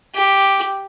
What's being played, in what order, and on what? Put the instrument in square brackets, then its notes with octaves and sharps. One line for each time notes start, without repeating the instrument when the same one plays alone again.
[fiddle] G4